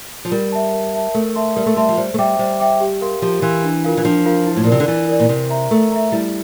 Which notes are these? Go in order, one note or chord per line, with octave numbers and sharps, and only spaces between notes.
F3
G3 A#4
E5 A5
A#4
E5 A5
A3 A#4
E5 A5 C6
G3 A#4
A3
G3 E5 A5 C6
F3
G3 C5
A3
G3 E5 G5 D6
G3 C5
E5 G5 D6
G4
A#4 F5 C6
F3 G4
E3 A#4 F5 C6
D4
F4 A#4 F5
E3
F3 D4
F4 A#4 F5
E4
A2
A#2
C3 A#4 D5
D3
E3 E4
A#4 D5
A#2
C3 A#4
E5 A#5
A3 A#4
E5 A#5
G3 E4